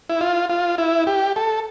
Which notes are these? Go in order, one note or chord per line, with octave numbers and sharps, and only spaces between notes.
E4
F4
F4
E4
G4
A4